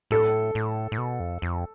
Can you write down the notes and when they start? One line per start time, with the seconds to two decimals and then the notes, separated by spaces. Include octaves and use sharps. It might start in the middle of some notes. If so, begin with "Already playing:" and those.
0.11 A2 A4
0.55 A2
0.92 A2
0.98 B2
1.20 F2
1.42 F2